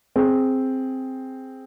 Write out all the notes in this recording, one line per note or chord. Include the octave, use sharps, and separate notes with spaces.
C4 G#4